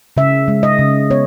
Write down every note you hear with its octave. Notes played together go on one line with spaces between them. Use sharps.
C#3 E5
G#3
D#5
C#3
B3 C#5